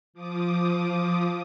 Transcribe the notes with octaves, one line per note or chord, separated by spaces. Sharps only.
F3 D6 D#6